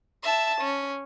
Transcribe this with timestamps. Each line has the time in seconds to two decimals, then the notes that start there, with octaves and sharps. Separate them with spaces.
0.23 E5 A5
0.61 C#4